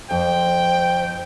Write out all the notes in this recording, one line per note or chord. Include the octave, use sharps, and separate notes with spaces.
F2 C5 G5